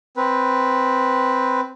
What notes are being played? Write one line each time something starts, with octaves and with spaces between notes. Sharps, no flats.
C4 B4